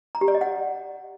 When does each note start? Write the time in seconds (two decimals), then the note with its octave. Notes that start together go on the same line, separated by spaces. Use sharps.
0.15 A#5
0.21 G4
0.28 D5
0.35 D#5
0.41 F#5